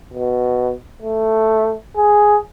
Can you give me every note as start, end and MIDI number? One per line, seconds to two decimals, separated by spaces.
0.13 0.72 47
1.02 1.75 57
1.97 2.37 68